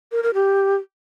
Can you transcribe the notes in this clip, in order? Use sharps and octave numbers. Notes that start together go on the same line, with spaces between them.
A#4
A#4
G4